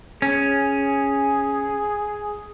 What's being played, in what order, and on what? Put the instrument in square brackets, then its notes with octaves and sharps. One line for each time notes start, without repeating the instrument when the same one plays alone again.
[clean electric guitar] C#4 [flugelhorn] G#4